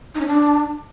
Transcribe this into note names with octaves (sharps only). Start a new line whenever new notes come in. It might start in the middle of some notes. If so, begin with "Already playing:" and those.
D#4
C#4
D4